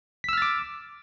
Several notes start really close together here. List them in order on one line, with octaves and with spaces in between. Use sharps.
B6 E6 F6 A6 D6